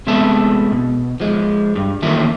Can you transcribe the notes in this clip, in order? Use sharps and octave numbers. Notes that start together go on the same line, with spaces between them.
C3 G#3 A3 B3 E5 A5
B2
F3 G#3
G2
D#3 E3 A3 A#3 F4 A#4